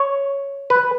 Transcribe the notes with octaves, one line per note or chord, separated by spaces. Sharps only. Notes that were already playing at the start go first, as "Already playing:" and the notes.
Already playing: C#5
B4